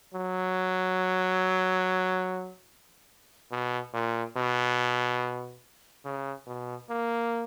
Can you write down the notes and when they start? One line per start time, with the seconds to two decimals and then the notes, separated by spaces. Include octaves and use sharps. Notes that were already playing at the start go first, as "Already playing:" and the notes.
0.14 F#3
3.51 B2
3.94 A#2
4.36 B2
6.05 C#3
6.46 B2
6.89 A#3